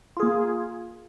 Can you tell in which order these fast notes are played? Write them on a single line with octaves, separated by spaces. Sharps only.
F4 G#4 A#3